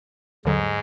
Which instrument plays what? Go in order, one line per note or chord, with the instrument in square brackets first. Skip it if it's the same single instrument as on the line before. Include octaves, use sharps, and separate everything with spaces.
[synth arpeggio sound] D#2 D3 F#3 [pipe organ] G#2